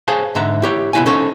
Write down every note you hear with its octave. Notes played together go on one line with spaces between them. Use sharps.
G#4 C5 C#5 F5 G#5 A5
G#2 D3 E5 A#5
E4 G4 C#5
C#2 B2 C4 E4 F5 G#5
C#4 D#4 A4 C5 C#5